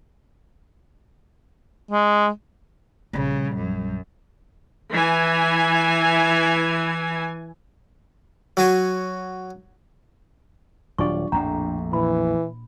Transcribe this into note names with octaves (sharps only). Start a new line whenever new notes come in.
G#3
A#1 C#3 G3
F#2
E3 G#5
F#3 F#4 G#5 C#6
D#1 F#3 D4 F4 G4 D5 C#6
A#1 F2 A2 D4 F#5 G5 A#5
A#2 E3 B5